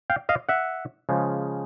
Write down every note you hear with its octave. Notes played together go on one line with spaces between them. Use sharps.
F5 G5
D#5 F5
E5 F#5
C#3 F3 G#3